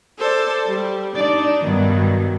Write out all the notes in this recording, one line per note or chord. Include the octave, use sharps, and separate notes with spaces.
A4 C5 D5
G3
D4 D#4 D5
G2 B2 D#3 F#3